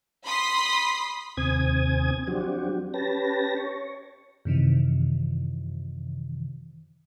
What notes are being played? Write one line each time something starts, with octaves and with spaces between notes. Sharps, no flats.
B5 C6 D#6 B6 C7
D#2 C3 C4 G#5 D#6 G#6
F3 F#3 C4 D4 F#4 G4
C#4 G4 B4 A5 A#6
C#5
F#2 C3 D#3 E3